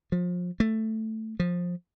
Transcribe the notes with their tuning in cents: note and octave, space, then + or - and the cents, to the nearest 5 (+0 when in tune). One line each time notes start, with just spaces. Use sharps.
F3 +30
A3 +5
F3 +15